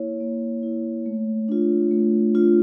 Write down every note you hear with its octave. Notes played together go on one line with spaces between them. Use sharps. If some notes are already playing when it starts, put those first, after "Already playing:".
Already playing: A#3 E4 C#5
A#3
E4
A3
D4 F4
A3
D4 F4